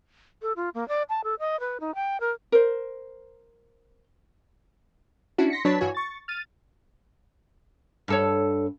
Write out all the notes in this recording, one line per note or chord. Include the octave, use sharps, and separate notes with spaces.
A4
F4
A#3
D5
A5
A4
D#5
B4
D#4
G5
A#4
A#4 C5
C#4 D4 E4 F#4
C6 A#6 B6 C#7
F#3 D4 B4 C#5 A5 B6
G2 E3 F#4 C#5 G#5
C#6 A6
F6 A6 D#7
G2 A4 C#5